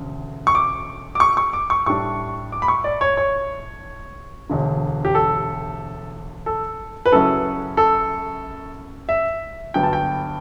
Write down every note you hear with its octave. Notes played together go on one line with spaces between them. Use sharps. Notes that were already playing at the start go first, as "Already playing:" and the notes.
Already playing: E1 D2 C#3
C#6
D6
D6
C#6
C#6
D6
C#6
A2 G3 D4 C#6
D6
B5
C#6
D5
C#5
C#5
E1 D2 D3
G4
A4
A4
B4
F#2 C#3 F#3 C#4 E4 A4
A4
E5
G1 G2 F#3 B3 G5
A5
G5